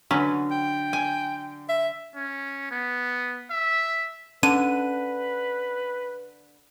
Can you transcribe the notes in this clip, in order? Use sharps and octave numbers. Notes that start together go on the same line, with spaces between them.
D3 F#3 C#4 B4
G5
G#5
E5
C#4
B3
E5
D3 C#4 B4 D#7